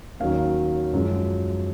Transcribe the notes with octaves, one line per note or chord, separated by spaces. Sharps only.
D#2 D#3 F#3 C#4 F5
F#2 F3 G#3